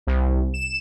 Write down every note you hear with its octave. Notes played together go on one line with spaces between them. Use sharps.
C2
E7